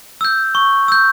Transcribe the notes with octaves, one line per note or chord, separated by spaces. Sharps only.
E6 G6
C#6
E6 G6